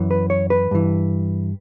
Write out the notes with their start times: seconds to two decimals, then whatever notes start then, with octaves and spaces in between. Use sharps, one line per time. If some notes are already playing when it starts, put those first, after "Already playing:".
Already playing: F#2 E3
0.11 B4
0.30 C#5
0.50 B4
0.71 G2 E3